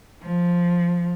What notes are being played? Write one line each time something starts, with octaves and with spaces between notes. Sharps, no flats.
F3